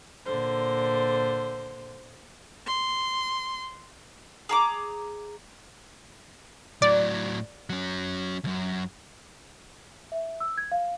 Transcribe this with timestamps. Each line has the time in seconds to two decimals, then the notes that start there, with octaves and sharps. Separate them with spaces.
0.24 A#2 D3 C5
2.67 C6
4.49 G#4 A#5 D6
6.82 A2 F#3 D5
7.70 F#3 C#4
8.44 C#2 F#2
10.12 E5
10.40 E6
10.57 G#6
10.72 F5